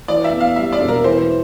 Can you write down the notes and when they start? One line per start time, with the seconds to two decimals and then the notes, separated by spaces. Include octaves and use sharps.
0.08 E3 D5
0.24 E5
0.32 E2
0.40 F5
0.56 G3 E5
0.72 D5
0.81 E1
0.88 A#4
1.04 E3 C5